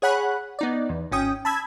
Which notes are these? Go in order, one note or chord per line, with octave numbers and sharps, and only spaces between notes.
G#4 C#5 F#5 B5 F#6
B3 D#4 D5
E2
G#1 C#4 G5 D#6
A5 B5 E6 G#6